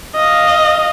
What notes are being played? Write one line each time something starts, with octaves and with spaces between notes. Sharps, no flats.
D#5 F5